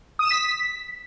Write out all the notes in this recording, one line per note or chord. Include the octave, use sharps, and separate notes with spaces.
D#6
E7
B6